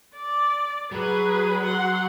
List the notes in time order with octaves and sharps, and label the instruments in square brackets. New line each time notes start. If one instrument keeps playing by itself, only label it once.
[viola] D5
[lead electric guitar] F#3 [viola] G#4 B4
[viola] F#5 C6